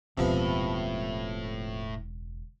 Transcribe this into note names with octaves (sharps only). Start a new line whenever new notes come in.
E1 C#2 A2 C3 F3 B3 B5